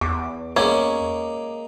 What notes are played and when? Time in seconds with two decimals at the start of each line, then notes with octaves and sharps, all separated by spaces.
0.01 E2 D6
0.56 G#3 A#3 C#4 D6